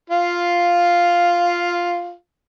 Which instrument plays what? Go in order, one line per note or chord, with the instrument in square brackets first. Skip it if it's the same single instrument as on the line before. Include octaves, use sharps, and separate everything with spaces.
[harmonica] F4 F5